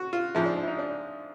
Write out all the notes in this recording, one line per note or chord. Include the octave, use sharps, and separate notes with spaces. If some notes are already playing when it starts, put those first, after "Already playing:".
Already playing: F#4
F4
G#2 F3 G#3 E4
D4
D4
E4
D#4
D4